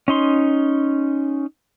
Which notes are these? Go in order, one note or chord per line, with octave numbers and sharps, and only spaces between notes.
C#4 D#4 C6